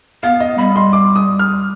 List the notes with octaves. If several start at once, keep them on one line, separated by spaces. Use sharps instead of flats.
B3 F5
D#5
G3 B5
C6
D6
D#6
F6